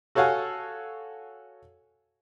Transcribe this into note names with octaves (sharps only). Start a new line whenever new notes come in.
F#4 A4 C#5 F5 F#5 G#5